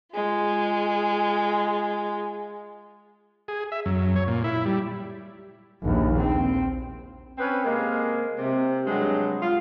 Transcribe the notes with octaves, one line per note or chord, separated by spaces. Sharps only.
G#3 F4
G#4
E5
F#2
C#5
A#2
E4
G3
A#1 D#2
C4
C4 C#4 B4
C3 G#3 A#3
C3
G2 F#3 G#3
F4